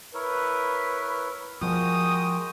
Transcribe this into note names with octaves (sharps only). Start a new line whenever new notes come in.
E4 A#4 B4 C#5
F3 G#3 F#4 A#4 G5 D#6